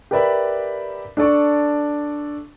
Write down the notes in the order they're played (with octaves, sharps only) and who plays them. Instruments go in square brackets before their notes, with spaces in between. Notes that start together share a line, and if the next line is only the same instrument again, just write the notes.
[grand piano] G4 A#4 B4 D5 E5 B5
D4 A4 D5 C#6